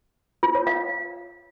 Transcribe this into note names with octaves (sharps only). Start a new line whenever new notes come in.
F4
C#5
F5